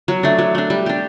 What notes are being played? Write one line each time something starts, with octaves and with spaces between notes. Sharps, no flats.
F#3
A3 D4
F#3
A3 D4
G3
D4 G4